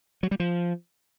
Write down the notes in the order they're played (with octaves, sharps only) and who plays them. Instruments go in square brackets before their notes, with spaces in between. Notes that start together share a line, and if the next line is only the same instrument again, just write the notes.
[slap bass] F#3
G3
F3